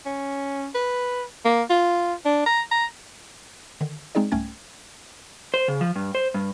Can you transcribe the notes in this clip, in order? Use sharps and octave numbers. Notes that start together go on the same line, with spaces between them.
C#4
B4
A#3
F4
D4
A#5
A#5
D3 D#3
G#3 C4 D#4 G#4 D5
C2 G#2 A3 C#4 G5 G#6
C5
C#3
F3
G2
C5
G2